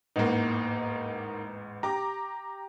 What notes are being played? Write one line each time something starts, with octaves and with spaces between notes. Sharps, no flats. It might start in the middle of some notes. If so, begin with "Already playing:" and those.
A1 E2 G#2 A#3 D#4
G4 A#5 D6